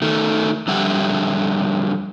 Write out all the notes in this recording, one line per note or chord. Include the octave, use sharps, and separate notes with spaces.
D#3 A3
F2 D3 G3 E5 F#5